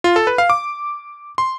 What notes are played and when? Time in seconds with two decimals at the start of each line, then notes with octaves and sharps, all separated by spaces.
0.04 F4
0.16 A4
0.27 B4
0.38 F5
0.50 D6
1.38 C6